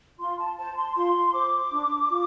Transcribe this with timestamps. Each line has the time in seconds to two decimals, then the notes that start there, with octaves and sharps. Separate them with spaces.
0.19 F4 C6
0.39 A5
0.57 C5 A5
0.77 C6
0.96 F4 C6
1.34 C5 D6
1.71 D4
2.09 F4